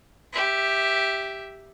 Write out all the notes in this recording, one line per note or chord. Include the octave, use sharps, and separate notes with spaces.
G4 E5